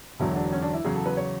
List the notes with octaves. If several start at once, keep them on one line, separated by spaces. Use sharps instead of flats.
E1 E2 D3 F#3 E4
D4
C#4
D4
E4
E2 C#3 F#3 G#4
A4
B4
C#5